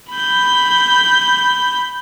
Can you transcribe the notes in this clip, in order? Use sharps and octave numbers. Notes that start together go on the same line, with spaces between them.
B5 G6